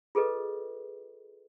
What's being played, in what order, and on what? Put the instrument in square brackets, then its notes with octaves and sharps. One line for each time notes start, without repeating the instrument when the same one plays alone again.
[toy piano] F4 G#4 A4 B4 D#5